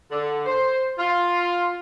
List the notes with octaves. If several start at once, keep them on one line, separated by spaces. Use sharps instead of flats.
D3
C5
F4